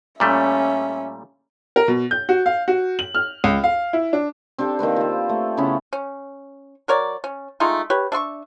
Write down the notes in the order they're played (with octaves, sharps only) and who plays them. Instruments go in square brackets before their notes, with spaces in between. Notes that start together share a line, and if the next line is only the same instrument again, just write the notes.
[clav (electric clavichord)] A#2 G3 A3 [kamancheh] C#4 E5
[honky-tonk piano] A#4
B2
G6
F#4
F5
F#4
F#7
F6
C#2
F5
E4
D4
[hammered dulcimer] C4 D4 G4 A4
D#3 A#3 C4 B4
F4 C5
A3
C#3 B3 C#4 E4
[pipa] C#4
F#3 A#4 C#5 D5
C#4
G#3 A3 D#4 F4
G4 B4 C#5
D4 E5 C6 C#6